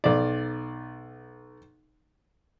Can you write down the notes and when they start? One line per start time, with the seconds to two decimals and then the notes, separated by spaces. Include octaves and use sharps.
0.04 B1 D5